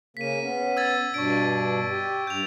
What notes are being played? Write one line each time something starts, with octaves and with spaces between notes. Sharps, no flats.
C#3 A#3 B6 D#7
B3 C#4
E6 G#6 A6
G2 B2 D4 C#6 D7
G4
G2 G6 F7